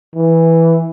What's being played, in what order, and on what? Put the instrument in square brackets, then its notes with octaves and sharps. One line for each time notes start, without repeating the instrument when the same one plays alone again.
[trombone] E3